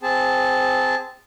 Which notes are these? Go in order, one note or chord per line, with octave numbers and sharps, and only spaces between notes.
C4 G#4 A5